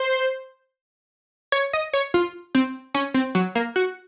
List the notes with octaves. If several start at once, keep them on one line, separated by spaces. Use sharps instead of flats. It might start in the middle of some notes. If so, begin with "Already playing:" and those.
Already playing: C5
C#5
D#5
C#5
F4
C4
C#4
C4
F#3
A#3
F#4